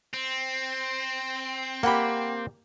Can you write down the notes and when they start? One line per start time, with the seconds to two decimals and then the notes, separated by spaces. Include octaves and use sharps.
0.14 C4
1.83 A#3 G4 F#5 G5 B5